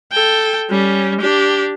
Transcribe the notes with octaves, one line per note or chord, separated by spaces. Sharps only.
A4 G5
G3 C#4
D4 G4